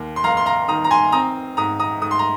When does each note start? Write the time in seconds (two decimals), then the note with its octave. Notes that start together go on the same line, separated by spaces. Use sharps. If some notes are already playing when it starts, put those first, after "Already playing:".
Already playing: D#2 A#3
0.16 C6
0.24 F1 F5 A#5
0.37 C6
0.46 F5 A#5
0.68 D#3 A#5 D#6
0.84 A#5
0.91 G#5 C6
1.12 C4 A#5 D#6
1.57 G#2 A#5 D#6
1.80 A#5 D#6
2.02 G#2 D#6
2.11 C6
2.19 A#5